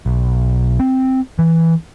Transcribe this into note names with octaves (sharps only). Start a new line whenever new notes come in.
B1
C4
E3